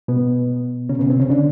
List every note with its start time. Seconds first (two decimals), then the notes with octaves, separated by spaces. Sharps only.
0.08 B2 B3
0.89 C#3 C#4
0.99 B2 B3
1.10 C3 C4
1.20 C#3 C#4
1.30 D3 D4